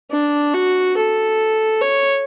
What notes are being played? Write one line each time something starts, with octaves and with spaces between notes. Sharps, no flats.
D4
F#4
A4
C#5